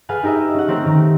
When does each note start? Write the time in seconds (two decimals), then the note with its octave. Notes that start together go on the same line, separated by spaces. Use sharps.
0.09 G#4 A4 B4 F5 F#5 G#5
0.23 D#4 G4 A#4 D#5 E5
0.54 C#4 F#5
0.68 A3 C4 C#4 G4 A#4
0.86 D#3 A#5